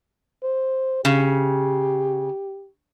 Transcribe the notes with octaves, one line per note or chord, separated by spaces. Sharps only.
C5
C#3 G4